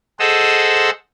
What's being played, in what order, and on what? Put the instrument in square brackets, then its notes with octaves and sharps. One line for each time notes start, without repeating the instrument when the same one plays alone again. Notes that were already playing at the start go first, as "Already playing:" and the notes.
[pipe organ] G#4 A4 C5 D#5 F#5 E6